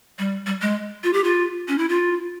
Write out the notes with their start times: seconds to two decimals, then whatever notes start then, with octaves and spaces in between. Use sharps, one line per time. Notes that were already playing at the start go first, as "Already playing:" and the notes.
0.19 G3
0.46 G3
0.62 G#3
1.04 F4
1.13 G4
1.24 F4
1.68 C#4
1.78 E4
1.89 F4